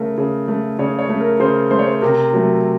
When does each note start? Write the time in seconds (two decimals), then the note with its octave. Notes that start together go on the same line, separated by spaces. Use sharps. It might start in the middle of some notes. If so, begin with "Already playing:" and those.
Already playing: C#3 A3 A#4
0.18 C#3
0.48 A3
0.79 C#3 C#5
0.99 C#5
1.09 A3
1.20 A#4
1.40 C#3 C5
1.71 A3 C5
1.79 C#5
1.87 C5
2.01 C3 A#4
2.33 F#3 A3